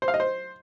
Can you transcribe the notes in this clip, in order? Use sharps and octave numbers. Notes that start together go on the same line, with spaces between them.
C5
F5
D#5
C5